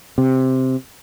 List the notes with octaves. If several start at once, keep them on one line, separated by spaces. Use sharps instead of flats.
C3